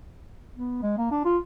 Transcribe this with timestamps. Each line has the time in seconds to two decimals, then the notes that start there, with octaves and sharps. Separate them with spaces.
0.55 B3
0.83 G#3
0.98 A#3
1.11 D4
1.25 F4